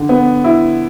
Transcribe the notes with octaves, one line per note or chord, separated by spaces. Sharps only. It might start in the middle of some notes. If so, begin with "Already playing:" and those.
Already playing: D3
B3
E4